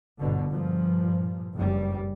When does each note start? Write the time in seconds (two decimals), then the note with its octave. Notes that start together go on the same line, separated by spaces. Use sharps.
0.19 G1 B2 D3
0.50 G2 A#2 F3
1.53 F#1 G2 G3